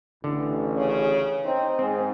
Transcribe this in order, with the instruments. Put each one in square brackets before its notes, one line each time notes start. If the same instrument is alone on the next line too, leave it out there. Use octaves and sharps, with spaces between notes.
[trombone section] A1 [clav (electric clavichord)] D3
[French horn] C#3
[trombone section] C4 [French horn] D#4
[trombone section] G#2 [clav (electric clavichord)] C4